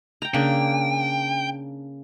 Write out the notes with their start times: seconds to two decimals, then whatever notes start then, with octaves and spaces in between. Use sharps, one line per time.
0.22 G5 A#5
0.34 C#3 A#3 D4 G5